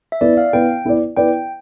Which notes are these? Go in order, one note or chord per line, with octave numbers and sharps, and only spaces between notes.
E5
B3 E4 B4 D5
F5
B3 E4 B4 G5
B3 E4 B4 D5
B3 E4 B4 D5 G5